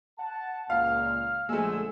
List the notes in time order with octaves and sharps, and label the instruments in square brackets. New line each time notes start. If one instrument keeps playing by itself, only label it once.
[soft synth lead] F#5 [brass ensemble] A5
[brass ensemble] C#2 A#2 [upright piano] F5 [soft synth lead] F6
[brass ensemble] A#1 D3 G#5 [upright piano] G#3 A3 [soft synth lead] E6